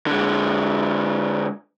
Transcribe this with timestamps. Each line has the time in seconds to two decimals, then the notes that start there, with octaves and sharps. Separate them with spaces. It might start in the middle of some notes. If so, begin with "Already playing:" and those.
0.07 D3 G#3